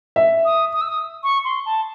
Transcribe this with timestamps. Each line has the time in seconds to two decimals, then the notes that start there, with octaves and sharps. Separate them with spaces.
0.16 E5
0.45 D#6
0.73 D#6
0.81 E6
0.89 D#6
1.23 C#6
1.45 C6
1.66 A5